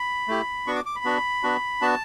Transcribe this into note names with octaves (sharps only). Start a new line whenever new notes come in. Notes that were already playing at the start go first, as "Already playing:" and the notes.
Already playing: B5
A3 E4 G4
B3 D4 F#4 C#6
D6
D6
B5
B3 D4 F#4
B3 D4 F#4
B3 D4 F#4 A5